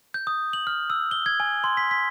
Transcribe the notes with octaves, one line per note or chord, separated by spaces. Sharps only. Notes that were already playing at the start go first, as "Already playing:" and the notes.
G6
D#6
F#7
F6
E6
G7
G#6
G#5
C6
B6
B6